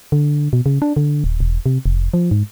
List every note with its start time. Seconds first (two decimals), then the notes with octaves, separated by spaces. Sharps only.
0.12 D3
0.53 B2
0.66 C#3
0.82 D4
0.97 D3
1.24 D#1
1.40 E1
1.66 C3
1.86 F1
2.14 F3
2.31 G#2